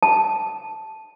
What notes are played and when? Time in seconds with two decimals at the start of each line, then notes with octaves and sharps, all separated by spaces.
0.03 A5